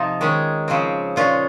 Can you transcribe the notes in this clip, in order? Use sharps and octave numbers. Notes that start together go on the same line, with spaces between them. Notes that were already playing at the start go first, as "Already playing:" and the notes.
Already playing: C3 F3 D#4 F4
D#3 G#3 C#4
C#3 F3 C4
A#2 G#3 C#4 F4